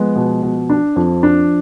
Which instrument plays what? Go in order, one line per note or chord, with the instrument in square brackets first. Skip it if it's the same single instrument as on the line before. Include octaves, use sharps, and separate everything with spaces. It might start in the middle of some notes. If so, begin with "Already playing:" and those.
Already playing: [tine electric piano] F3 [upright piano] G#3 B3
[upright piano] B2
B2
D4
[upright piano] F2 [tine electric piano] F3
[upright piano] D4